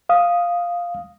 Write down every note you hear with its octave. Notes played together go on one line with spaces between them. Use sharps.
F5 D#6